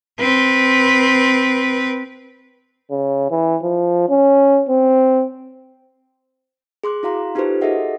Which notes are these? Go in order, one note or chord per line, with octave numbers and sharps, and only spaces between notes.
C4 B4
C#3
E3
F3
C#4
C4
G#4 C6 D6 F#6
E4 F#4 F5 A#5 C6
D#4 F4 G4 A4 B4 C5
F#4 G#4 A4 D#5 E5 F#5